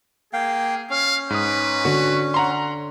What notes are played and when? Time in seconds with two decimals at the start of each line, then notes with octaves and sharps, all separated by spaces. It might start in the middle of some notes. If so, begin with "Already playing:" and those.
0.33 A#3 G#4 F5 G5
0.90 C#4 F5
1.30 G#2 B4 D#6
1.85 D3 F#4
2.34 F#5 A#5 C6